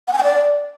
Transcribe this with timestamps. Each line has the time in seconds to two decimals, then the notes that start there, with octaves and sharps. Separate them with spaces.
0.08 F#5
0.13 G#5
0.18 G5
0.24 D5